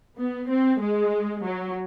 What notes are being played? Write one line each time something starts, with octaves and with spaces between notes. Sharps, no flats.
B3
C4
G#3
F#3